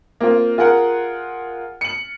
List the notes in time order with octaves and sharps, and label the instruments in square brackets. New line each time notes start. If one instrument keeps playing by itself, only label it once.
[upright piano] A#3 C4 F4
F4 G#4 A#4 F#5
C#7 F#7